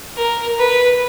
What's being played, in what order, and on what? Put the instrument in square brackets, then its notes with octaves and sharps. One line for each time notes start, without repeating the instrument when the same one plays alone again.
[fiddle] A#4
B4